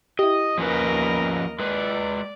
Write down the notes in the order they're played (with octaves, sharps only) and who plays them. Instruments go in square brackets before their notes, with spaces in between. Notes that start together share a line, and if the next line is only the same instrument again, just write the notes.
[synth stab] E4 G4 [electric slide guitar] D#5
[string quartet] D#2 A#4 D#5 [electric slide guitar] F3 C#4 B4
[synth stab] B5
[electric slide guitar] G#3 B4 [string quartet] D5